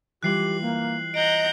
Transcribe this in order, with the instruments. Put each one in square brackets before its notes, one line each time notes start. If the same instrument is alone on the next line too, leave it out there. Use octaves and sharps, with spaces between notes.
[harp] E3 G3 F4 [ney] G4 [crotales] F#6 C7 F#7
[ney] A#3
[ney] D#5 [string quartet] F#5 A#5 G6 [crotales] D7